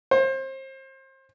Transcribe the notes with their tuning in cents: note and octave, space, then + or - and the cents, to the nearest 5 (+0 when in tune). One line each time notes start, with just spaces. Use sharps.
C5 +30